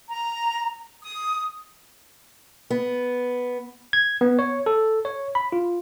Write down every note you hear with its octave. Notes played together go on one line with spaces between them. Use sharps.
A#5
D#6
B3
G#6
B3
C#5
A4
C#5
B5
F4